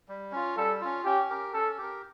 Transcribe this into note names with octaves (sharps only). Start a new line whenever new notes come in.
G3
C#4 F4
G3 A4
C#4 F4
C#4 G4
G4 A#4
C#4 A4
G4 A#4